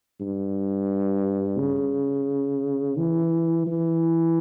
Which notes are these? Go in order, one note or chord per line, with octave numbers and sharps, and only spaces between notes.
G2
C#3
E3
E3